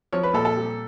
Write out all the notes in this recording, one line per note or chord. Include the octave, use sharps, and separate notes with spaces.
F3 C#5
B4
A#2 A4
A4
G3